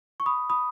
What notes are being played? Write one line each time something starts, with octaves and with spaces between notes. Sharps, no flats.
C#6
B5 D#6
B5 D#6